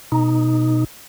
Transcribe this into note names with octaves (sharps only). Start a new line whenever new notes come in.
B2 D#4